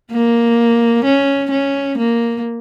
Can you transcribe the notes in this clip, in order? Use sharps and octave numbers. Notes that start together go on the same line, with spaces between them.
A#3
C#4
C#4
A#3